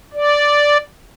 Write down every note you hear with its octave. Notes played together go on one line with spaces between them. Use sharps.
D5